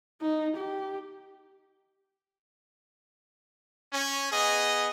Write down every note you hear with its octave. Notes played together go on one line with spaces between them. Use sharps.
D#4
G4
C#4
B3 G#4 D#5